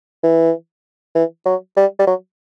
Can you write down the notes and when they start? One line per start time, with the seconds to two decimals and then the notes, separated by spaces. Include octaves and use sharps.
0.24 E3
1.15 E3
1.46 F#3
1.77 G3
1.99 G3
2.07 F#3